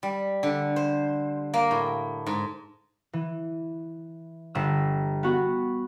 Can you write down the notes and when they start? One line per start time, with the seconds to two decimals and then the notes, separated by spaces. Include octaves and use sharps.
0.03 G3
0.43 D3
0.76 C5
1.54 A#3
1.71 A2
2.26 G#2
3.13 E3
4.55 G1 E6
5.23 B3 F#4